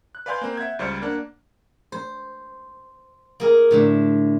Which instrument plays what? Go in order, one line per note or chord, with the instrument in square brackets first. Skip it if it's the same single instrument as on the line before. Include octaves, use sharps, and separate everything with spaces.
[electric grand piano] F#6
B4 D5 F5 G#5 C6 G6
A#3 C4
E5 F#5 G#6
C#2 G3 C5 D5 F6 C#7
A#3 D4 F#5
[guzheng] C5
A#3 G#4 A#4
A2 D3 E5